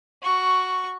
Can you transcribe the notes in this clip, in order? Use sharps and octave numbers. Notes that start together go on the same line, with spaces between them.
F#4 C#6